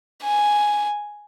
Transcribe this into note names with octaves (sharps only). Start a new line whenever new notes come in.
G#5